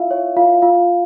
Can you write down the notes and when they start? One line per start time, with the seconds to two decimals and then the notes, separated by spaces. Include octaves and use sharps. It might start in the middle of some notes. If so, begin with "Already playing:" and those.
Already playing: E4 F4 E5 F5
0.11 C#5
0.37 F4 F5
0.62 F4 F5